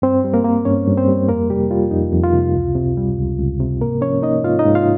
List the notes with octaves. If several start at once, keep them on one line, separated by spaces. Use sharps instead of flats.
G2 C4 C5
G3
A#3 A#4
A#3
G2 C#4 C#5
G2
C4 C5
G3
F2 A#3 A#4
C3 G3 G4
G3 F4
F2 D#4
F2
F4
C3
C#2
C3
G3
C#2
C#2
C3
G#2 A#3 A#4
F3 C#4 C#5
A#3 D#4 D#5
G#2 F4 F5
D#4 D#5
G#2
F4 F5